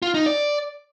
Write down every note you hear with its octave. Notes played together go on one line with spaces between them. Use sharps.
F4
D#4
D5